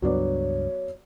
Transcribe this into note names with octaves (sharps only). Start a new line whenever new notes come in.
C#2 G2 F#3 B3 D4 C#5 D5